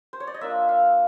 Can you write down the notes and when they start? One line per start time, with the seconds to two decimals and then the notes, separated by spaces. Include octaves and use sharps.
0.13 C5
0.20 C#5
0.27 D5
0.34 D#5
0.41 A#3 D4 F4 E5
0.69 F5